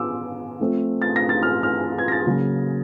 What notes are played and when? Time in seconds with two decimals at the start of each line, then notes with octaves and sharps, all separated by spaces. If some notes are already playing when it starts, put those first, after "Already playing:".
Already playing: B3 F4 D6 E6
0.59 F3 A3 C4
1.02 A6
1.16 A#6
1.29 A6
1.43 F6
1.63 F6
1.98 G#6
2.08 A#6
2.12 A6
2.26 C#3 F#3 A#3